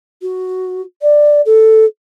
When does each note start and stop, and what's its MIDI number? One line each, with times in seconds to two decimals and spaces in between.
0.22 0.82 66
1.02 1.41 74
1.46 1.85 69